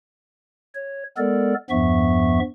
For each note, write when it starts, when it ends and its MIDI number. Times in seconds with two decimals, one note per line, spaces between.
0.75 1.04 73
1.18 1.54 56
1.18 1.54 59
1.18 1.54 69
1.18 1.54 70
1.18 1.54 74
1.70 2.40 40
1.70 2.40 43
1.70 2.40 53
1.70 2.40 59
1.70 2.40 76
1.70 2.40 85